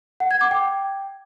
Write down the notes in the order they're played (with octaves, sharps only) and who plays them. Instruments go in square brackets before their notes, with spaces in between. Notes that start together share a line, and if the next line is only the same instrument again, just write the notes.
[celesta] F#5
G#6
D6
G5